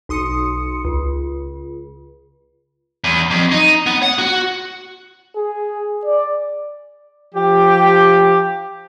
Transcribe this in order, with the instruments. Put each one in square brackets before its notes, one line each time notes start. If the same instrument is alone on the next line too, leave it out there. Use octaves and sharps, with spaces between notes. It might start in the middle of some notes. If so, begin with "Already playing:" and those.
[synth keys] B1 C6 D#6 C#7
C#2
[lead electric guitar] E2
F2
D#4
B3
F#5
F#4
[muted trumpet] G#4
D5
[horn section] F3 G4